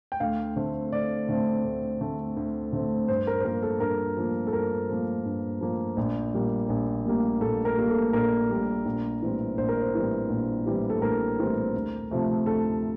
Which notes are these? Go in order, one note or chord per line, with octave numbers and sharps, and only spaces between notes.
G5
D2 F5
D3 A3 C4
D2 D5
D3 A3 C4
D2
D3 A3 C4
D2
D3 A3 C4
G2 C5
A#4
C5
F3 A#3 A#4
A4
G2 A#4
F3 A#3
A4
G2 A#4
F3 A#3
G2
F3 A#3
A#1
A#2 G3 A#3
A#1
A#2 G3 A#3
A#1 A4
A#4
A#2 G3 A#3
A4
A#1 A#4
A#2 G3 A#3
A#1
A2 E3 G3 C4
A#1 C5
A#4
C5
A2 E3 G3 C4
A#1
A2 E3 G3 C4
A4
A#1 A#4
A2 E3 G3 C4
D2
C3 F3 A3 C4
D2 A4